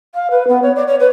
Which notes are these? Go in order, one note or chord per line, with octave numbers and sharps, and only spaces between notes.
F5
B4
B3
C#5
D5
C#5
B4